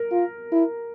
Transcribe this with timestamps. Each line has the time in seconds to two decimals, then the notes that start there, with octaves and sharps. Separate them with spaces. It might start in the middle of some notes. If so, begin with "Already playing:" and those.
Already playing: A#4
0.11 F4
0.52 E4